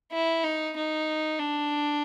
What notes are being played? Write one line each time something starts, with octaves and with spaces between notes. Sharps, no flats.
E4
D#4
D#4
D4